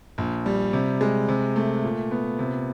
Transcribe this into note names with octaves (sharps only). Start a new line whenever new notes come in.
A#1
G3
C3
G#3
C3
A3
A#2
B3
C3